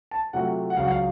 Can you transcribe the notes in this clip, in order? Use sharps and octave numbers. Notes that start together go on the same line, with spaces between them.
A5
C3 F#3 A3 C4 F4 F#5
F#5
C#2 C#3 F#3 F5
F#5
F5